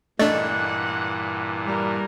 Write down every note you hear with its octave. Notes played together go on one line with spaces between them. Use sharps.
G2 A#2 E3 A3 D4 D#5 F#5
G3 A#4